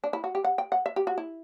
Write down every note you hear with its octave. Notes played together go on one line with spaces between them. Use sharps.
D4
E4
F#4
G4
F#5
G5
F#5
E5
G4
F#4
E4